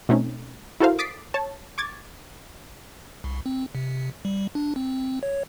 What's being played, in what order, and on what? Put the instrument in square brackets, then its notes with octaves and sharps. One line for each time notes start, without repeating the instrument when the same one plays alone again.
[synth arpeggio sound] B2 A3 C4 C#4 D#4
E4 F#4 A4 A#4 C5 F5
D6 D#6 A6 B6 C7 D7
C#5 A5
C#6 D6 G#6 A6
[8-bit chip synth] C2
C4
C3
G3
D4
C4
C#5